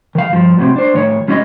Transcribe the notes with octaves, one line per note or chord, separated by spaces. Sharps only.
D#3 F5
G2 F3
F#2 A2 C3 C4
D4 C5
A2 D#3 C#5
G#3 C#4 E4 C#5 D#5